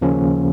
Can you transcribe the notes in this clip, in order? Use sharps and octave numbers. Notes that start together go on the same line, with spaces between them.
D#2 C#3 F3 A#3 C#4